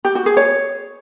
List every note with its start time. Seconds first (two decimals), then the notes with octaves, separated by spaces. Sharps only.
0.05 G4
0.15 F#4
0.26 G#4
0.37 C#5